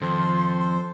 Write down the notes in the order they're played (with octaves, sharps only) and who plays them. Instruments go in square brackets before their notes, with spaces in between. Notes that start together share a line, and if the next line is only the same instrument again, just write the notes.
[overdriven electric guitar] F2 [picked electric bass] D#3 [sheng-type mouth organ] A4 C5 [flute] C6